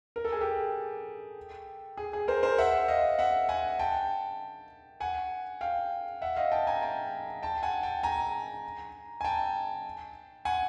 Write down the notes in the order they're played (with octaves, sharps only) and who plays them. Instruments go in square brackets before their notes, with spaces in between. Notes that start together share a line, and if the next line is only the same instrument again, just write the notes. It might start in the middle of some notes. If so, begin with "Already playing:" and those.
[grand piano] A#4
A4
G#4
G4 A4
G#4
G#4
A#4 C5
A#4 C5
E5 F#5
D#5 F5
E5 F#5
F#5 G#5
G5 A5
F#5 G#5
F5 G5
E5 F#5
D#5 F5
G5 A5
G#5 A#5
G5 A5
G5 A5
F#5 G#5
G5 A5
G#5 A#5
G#5
G5 A5
F#5 G#5